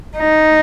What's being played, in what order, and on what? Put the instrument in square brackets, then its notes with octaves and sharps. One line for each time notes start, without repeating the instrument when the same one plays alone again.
[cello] D#4